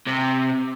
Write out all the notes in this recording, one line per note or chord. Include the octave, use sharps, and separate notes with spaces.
C3